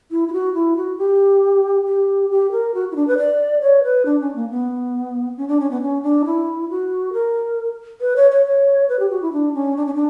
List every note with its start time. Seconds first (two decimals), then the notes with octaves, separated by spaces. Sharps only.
0.11 E4
0.28 E4
0.33 F#4
0.54 E4
0.77 F#4
0.98 G4
1.86 G4
2.30 G4
2.52 A#4
2.75 F#4
2.92 E4
2.96 D4
3.08 B4
3.18 D5
3.62 C#5
3.83 B4
4.06 D4
4.20 C#4
4.35 A#3
4.50 B3
5.37 C#4
5.48 D4
5.60 C#4
5.71 B3
5.81 C#4
6.03 D4
6.25 E4
6.70 F#4
7.13 A#4
8.01 B4
8.16 C#5
8.31 C#5
8.46 C#5
8.89 B4
8.99 G4
9.11 F#4
9.22 E4
9.33 D4
9.54 C#4
9.77 D4
9.86 C#4
9.95 D4